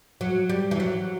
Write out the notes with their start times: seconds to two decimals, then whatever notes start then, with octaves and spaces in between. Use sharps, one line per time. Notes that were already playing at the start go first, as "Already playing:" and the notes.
0.21 F#3
0.49 G3
0.71 E3
0.80 F#3